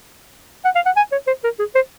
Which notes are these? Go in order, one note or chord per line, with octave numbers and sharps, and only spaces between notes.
F#5
F5
F#5
G#5
C#5
C5
A#4
G#4
C5